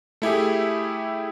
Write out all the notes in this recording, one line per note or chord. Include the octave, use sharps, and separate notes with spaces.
A3 E4 G4 G#4